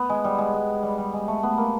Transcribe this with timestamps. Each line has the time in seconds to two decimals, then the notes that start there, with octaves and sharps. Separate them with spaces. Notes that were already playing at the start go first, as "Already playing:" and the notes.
Already playing: B3
0.10 G#3
0.24 G3
0.38 G#3
0.54 G#3
0.83 G3
0.98 G3
1.13 G#3
1.28 A3
1.43 B3
1.57 A#3